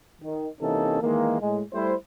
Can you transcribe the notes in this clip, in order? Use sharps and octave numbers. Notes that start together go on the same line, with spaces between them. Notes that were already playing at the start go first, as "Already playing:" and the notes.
D#3
C3 E3 A#3 C#4 D#4 A4
D#3 E3 G#3 A#3
A2 G#3
G3 A3 E4 C5